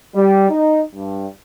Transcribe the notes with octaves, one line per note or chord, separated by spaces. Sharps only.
G3
D#4
G2